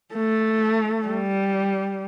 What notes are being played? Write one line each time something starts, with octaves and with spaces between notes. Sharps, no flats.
A3
G3